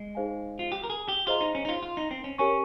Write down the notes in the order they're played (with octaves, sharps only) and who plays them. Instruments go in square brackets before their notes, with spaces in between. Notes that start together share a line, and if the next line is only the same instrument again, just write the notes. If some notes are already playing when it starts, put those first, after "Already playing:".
Already playing: [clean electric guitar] G#3
[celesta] D#4 G#4 C5 F5 G#5
[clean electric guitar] F4
G4
A#4
G#4
G4
[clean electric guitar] F4 [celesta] G#4 C5 D#5 A#5
[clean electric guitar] D#4
C#4
D#4
F4
F4
D#4
C4
C#4
[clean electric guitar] C#4 [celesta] G4 A#4 C#5 G#5 C#6